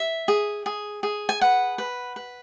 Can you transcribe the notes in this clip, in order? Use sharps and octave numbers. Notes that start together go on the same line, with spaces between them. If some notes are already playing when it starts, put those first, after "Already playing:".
Already playing: E5
G#4
G#4
G#4
G#5
B4 F#5
B4
B4